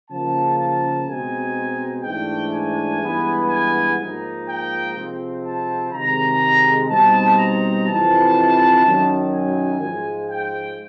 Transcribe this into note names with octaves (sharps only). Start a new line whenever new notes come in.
C#3 F3 A#3 A5
A5
B2 G#3 C4 D#4 G#5
G#2 E3 A3 D4 G5
G#5
G2 E3 G#3 B3
G#5
G#2 F3 A#3 D#4
G5
C3 F3 G#3 C4
A5
C3 D#3 G#3 A#5
B2 G3 C4 D#4 A5
A#5
F2 C3 E3 A5
F#2 D#3 F#3
G#5
G#2 F3 G#3
G5